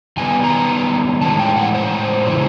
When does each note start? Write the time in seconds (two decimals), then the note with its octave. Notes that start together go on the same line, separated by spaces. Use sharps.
0.17 D#3 G3 B3 G#5
0.44 A#5
1.21 A2 E3 G#3 C#4 A5
1.39 G5
1.56 F#5
1.74 C5
2.27 C#3 E3 G#3 C#4 E4